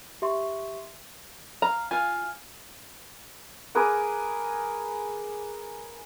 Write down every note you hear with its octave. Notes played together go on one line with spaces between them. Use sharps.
G4 E5 C6 C#6
F5 A#5
F4 F5 G#5
G#4 A#4 B4 D6